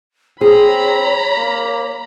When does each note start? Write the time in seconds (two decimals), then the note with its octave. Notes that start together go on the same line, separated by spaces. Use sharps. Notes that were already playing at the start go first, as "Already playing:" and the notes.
0.41 C4 G#4 C#5 A#5 B5
1.37 A#3